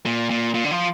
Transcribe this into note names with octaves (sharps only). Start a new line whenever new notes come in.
A#2
A#2
A#2
D3
F3